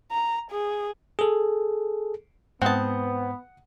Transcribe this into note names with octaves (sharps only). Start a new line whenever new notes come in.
A#5
G#4
G#4 A4
G#2 B3 C4 F#5 A5 D#6